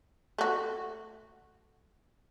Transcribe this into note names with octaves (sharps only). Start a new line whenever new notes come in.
A3 F#4